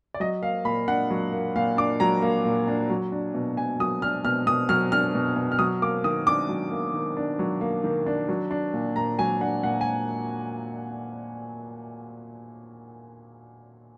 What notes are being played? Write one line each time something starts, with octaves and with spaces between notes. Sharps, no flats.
D5
F#3 D#5
A#3 F5
A#2 B5
D4 F#5
F#3
A#3
A#2 F5
D4 D6
F#3 A#5
A#3
A#2
D4
F#3
D4
B2
B2 G#5
F#3 D#6
D4 F6
B2 F6
B2 D#6
F#3 F6
D4 F6
B2
B2
F6
F#3 D#6
A#3 D6
D#3 D#6
D4 D6
F#3
A#3
D#3
D4
F#3
A#3
D#3
D4
F#3
D4
A#2
A#2 A#5
F#3 G#5
D4 F#5
A#2 F#5
G#5